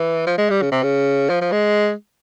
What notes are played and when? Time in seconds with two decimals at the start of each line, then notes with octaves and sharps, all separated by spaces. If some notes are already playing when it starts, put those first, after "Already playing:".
Already playing: E3
0.26 F3
0.38 G#3
0.50 G3
0.62 C#3
0.72 C3
0.83 C#3
1.30 F3
1.41 F3
1.52 G#3